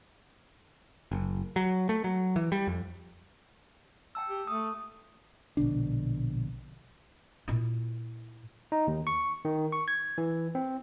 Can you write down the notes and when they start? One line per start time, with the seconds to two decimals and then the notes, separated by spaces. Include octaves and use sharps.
1.12 F#1
1.56 F#3
1.89 A3
2.04 F#3
2.36 E3
2.52 G3
2.67 F2
4.15 G5 A5 E6
4.29 G4
4.47 A3 D#6
5.57 A#1 B2 D3 D4
7.48 A#2 E4
8.72 D#4
8.87 D#2
9.07 C#6
9.45 D#3
9.72 C#6
9.88 G#6
10.18 E3
10.55 C4